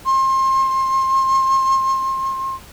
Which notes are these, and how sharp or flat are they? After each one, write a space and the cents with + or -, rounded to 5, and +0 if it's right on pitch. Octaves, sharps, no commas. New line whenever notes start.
C6 +30